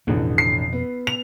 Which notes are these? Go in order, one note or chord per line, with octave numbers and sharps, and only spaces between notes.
A1 F2 B2 D3
C7
B3
F7